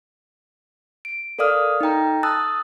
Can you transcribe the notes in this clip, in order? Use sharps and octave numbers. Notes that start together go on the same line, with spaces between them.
D7
A4 A#4 D5 F5 D#6 F6
D#4 A4 G5 A#5
A5 D#6 E6 F#6 A6